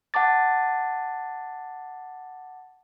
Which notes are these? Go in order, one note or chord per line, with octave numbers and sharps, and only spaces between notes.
F#5 A5 D6 A6